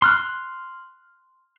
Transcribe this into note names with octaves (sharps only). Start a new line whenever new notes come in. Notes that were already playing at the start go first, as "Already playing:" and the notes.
C6 F6 F#6